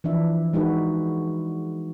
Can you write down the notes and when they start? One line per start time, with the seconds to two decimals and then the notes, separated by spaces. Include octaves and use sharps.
0.04 E3 F3 D4 E5
0.53 G#3 D#4 F#4 B4